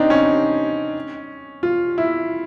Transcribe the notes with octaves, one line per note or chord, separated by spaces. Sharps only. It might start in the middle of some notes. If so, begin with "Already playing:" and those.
Already playing: C4 D4 D#4
C#4
F4
E4